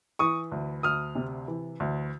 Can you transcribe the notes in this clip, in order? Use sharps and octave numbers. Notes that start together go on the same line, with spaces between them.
E3 C#6 D#6
D2
D2 D#6 F6
C3
E3
D2